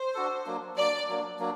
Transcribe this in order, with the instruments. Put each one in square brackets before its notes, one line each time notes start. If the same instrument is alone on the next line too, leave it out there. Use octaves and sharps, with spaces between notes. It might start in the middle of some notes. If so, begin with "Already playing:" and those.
Already playing: [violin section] C5
[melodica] D4 F#4 A4
F#3 A#3 D4
[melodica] F#3 A#3 D4 [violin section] D5
[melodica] F#3 A#3 D4
F#3 A#3 D4